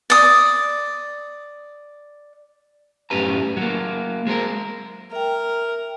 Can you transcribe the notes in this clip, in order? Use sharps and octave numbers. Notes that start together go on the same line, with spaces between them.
D5 D#6
F#2 A2 C#4 G4 B4 A#5
F#3 A#3
G#3 C4 A4 A#4
A#4 E5 G5